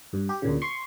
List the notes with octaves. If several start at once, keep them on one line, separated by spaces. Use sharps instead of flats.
G2
G4
D2 A#2 C#3
C6 C#6